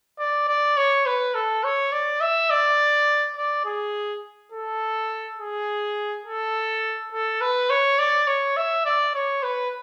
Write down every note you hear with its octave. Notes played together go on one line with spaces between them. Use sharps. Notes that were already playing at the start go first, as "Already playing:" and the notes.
D5
D5
C#5
B4
A4
C#5
D5
E5
D5
D5
G#4
A4
G#4
A4
A4
B4
C#5
D5
C#5
E5
D5
C#5
B4